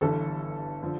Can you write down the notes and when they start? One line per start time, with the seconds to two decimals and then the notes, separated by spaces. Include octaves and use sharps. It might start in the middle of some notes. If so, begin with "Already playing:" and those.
0.01 G1 G2 E3 A4
0.83 D3 F3